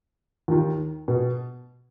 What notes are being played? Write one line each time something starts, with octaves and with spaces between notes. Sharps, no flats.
D#2 D#3
B2